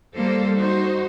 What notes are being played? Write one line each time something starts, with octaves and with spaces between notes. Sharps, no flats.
G3 A#3 A4 C5
D#4 F#4 C5